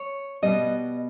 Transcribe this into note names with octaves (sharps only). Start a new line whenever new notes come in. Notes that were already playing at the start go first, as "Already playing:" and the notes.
Already playing: C#5
B2 G3 B3 D#5